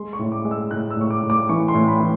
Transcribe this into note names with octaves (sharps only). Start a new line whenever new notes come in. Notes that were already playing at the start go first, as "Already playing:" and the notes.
Already playing: G#3 C6
C#6
A2
D6
G#3
E6
A2 F#6
E6
A2 C#6
D6
A2
D6
E3 C#6
C6
A2
B5
E3